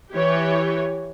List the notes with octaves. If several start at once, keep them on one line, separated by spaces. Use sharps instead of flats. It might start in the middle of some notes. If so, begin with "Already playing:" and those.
E3 G4 C#5